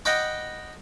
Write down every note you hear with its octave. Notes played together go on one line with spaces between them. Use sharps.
D#5 F#5 G5 B5 D6